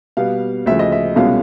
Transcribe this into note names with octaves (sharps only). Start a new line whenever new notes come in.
B2 G3 B3 F5
D2 C#3 F3 E5
D#5
E5
C2 B2 G#3 C#4 F4 F5